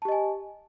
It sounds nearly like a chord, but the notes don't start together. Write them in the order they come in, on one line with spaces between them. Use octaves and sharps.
A5 G4 D#5 G#5